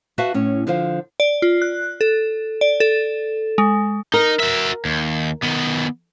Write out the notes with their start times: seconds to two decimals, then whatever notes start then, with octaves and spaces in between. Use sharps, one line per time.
0.18 F#4 B4 E5 F5 A5
0.34 A2 C#4
0.67 D3 F3 F4 C5 F5
1.20 D5
1.42 F4
1.62 F#6
2.01 A4
2.61 D5
2.80 A4
3.58 G#3
4.14 D#4 A#4
4.40 F#4 E5
4.85 D#2
5.43 D#3 B3